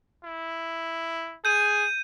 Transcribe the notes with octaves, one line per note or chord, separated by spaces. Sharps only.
E4
G#4 G6 D#7